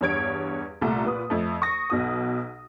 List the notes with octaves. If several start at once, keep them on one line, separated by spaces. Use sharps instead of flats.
E2 G2 C#5 G#6 D7
C2 A#2 A3 A#5
A#2 B4 D#6
F2 A3
C#6 D#6 A#6
B1 B2 D#6